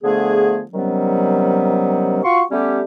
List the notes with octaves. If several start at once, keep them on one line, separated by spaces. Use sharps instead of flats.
D3 F3 A3 B3 G#4
C3 D#3 F#3 G3 B3 C#4
F4 F#4 C6 C#6
G3 A3 B3 C#4 G4